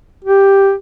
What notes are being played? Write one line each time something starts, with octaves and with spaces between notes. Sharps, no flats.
G4